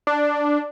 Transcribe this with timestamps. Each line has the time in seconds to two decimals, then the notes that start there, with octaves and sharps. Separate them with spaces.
0.07 D4